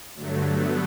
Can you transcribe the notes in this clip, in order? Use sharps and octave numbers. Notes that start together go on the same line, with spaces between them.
G2 D3 F#3 A3
B3